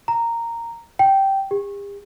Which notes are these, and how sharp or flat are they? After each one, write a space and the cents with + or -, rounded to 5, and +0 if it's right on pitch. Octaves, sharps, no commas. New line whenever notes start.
A#5 -10
G5 -10
G4 +45